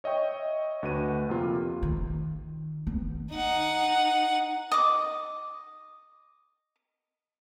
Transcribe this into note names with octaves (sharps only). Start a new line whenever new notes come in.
C#5 D#5 E5 G5 C#6
D2 F#4 B4 D#7
F2 C3 A#3 F4
D#3
B3
D#4 F#5
D#5 D6